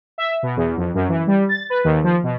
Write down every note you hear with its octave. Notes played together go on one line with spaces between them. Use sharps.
E5
B2
E2
F2
F#2
E3
G3
A6
B4
D#2
F3
B2